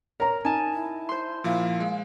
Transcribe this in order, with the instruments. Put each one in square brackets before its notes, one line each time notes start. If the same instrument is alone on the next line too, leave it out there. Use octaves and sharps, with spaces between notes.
[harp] A#4 [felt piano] C#5 A#5
[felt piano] D#4 [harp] G#5 A5
[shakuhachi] E4
[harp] C5 C6
[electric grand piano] A#2 F3 E4 [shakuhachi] F5
[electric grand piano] G#3